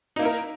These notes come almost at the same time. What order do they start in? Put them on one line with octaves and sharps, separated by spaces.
D#4 A#3 E4 A#4